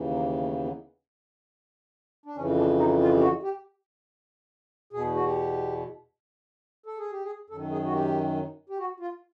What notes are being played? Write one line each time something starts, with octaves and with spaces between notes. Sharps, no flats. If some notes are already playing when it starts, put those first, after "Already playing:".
Already playing: D#2 C#3 E3
A#3
A3
B3
D4
F2 C#3 E3 C#4
D4
D#4
F4
G4
F#4
G4
E2 B2 G#4
F#4
G4
A4
G#4
G4
G#4
F#2 D#3 A4
G#4
F#4
G4
G4
F#4
F4